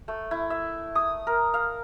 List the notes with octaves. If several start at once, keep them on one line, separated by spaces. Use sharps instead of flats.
A3
E4
E5
D#6
A#4
F5